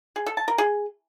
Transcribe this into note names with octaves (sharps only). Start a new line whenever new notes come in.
G#4
A4
A5
A#4
G#4